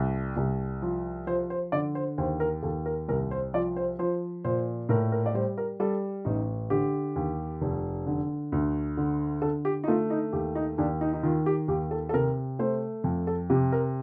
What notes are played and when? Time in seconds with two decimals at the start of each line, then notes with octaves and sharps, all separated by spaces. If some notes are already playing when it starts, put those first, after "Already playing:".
Already playing: C2
0.37 C2
0.82 F3
1.27 F3 C5
1.50 C5
1.72 D3 D5
1.95 C5
2.18 D#2 C5
2.40 A#4
2.63 D#2 A4
2.86 A#4
3.08 C2 A#4
3.31 C5
3.54 F3 D5
3.76 C5
3.99 F3 C5
4.44 A#2 C5
4.89 A2 A#4
5.12 A#4
5.26 D5
5.34 G3 C5
5.58 A#4
5.80 G3 A4
6.25 A1 D#4
6.70 D3 G4
7.16 D#2
7.61 F1
8.07 D3
8.52 D2
8.97 D3
9.42 D3 A4
9.65 G4
9.84 D#4
9.87 A3 F4
10.10 D#4
10.33 D#2 G4
10.55 D#4
10.78 D#2 D4
11.01 D#4
11.13 D#4
11.23 D#3 F4
11.46 G4
11.68 D#2 G4
11.91 A4
12.09 A4
12.13 C3 A#4
12.59 A3 C5
13.04 F2
13.27 A4
13.50 C3 G4
13.72 A#4